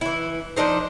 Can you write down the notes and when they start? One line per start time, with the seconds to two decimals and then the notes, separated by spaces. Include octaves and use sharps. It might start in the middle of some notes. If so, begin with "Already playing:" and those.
0.01 E3 E4
0.57 F3 D4 D#4 C5